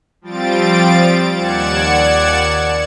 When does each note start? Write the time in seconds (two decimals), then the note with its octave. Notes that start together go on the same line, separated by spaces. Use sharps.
0.22 F3 G3 C4 F4 A6 D7
1.35 D#2 D5 F#5 G#6 C#7 E7